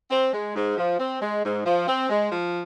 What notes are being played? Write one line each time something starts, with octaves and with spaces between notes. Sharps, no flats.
C4
G#3
G#2
F3
C4
G#3
G#2
F3
C4
G#3
F3